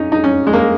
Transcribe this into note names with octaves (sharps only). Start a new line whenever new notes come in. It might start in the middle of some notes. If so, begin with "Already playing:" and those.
Already playing: C#4 D#4
D#4
C#4
G#3
A#3